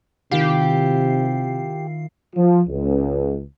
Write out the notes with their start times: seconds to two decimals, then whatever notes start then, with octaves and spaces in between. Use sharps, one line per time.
0.31 C3 D#3 E4 F4 G4 C7
2.36 F3
2.68 C#2